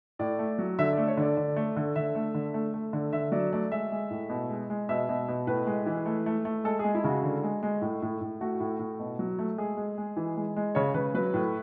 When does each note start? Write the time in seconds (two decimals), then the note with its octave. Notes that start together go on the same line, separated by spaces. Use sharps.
0.19 A2 D5
0.39 A3
0.59 F#3
0.79 D3 E5
0.93 A3 D5
1.08 C#5
1.17 D3 D5
1.37 D3
1.56 A3
1.76 D3
1.96 D3 E5
2.15 A3
2.35 D3
2.54 A3
2.74 A3
2.93 D3
3.13 D3 E5
3.32 F#3 D5
3.53 A3 D5
3.71 G#3 E5
3.92 G#3
4.11 A2
4.30 B2
4.50 G#3
4.70 G#3
4.89 B2 E5
5.09 B2
5.28 B2
5.47 A2 B4
5.67 G#3
5.86 E3
6.06 A3
6.26 A3
6.45 A3
6.64 G#3 A4
6.79 G#3 G#4
6.95 E4
7.04 C#3 F#4
7.23 D3
7.44 G#3
7.63 G#3
7.81 A2
8.02 A2
8.21 A2
8.41 A3 F#4
8.60 A2
8.79 A2
8.99 B2
9.19 F#3
9.39 A3
9.58 G#3 G#4
9.77 G#3
9.98 G#3
10.17 E3
10.37 G#3
10.56 G#3
10.75 C#3 C#5
10.94 C#3 B4
11.14 F#3 B4
11.34 A2